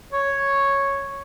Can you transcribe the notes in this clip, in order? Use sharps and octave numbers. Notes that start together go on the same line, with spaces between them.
C#5